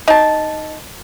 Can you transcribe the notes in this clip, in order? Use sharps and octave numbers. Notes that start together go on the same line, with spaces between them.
D#4 A5